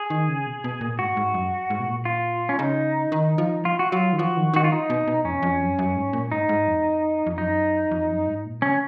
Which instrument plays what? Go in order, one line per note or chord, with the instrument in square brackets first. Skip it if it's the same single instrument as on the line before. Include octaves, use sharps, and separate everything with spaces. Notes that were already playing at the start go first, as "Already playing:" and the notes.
Already playing: [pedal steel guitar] G#4
[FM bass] D#3
C#3
B2
B2
A#2
[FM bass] G#2 [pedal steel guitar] F#4
[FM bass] G#2
F#2
G#2
B2
A#2
[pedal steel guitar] F4
C#4
[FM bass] C#3 [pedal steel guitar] D#4
[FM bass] D#3
F3
[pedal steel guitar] F4
F#4
[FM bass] F#3 [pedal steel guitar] F4
[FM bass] D#3
[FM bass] F3 [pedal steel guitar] F#4
[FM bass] D#3
[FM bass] D#3 [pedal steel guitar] F#4
[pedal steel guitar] F4
D#4
[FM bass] B2
B2
[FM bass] F2 [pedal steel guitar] C#4
[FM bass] F2
F#2
F#2
G#2
A#2
[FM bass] G#2 [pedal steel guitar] D#4
[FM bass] G#2
F2
F2
[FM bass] F#2 [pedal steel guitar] D#4
[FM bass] F2
F#2
G#2
A#2
[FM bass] C#3 [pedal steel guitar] C#4